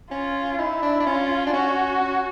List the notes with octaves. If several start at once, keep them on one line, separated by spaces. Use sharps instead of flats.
C#4 F4
D#4 E4
D4
D4
C#4 F4
D4
C#4 F#4
C#4